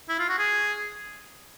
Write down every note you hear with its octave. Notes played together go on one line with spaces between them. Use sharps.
E4
F4
F#4
G#4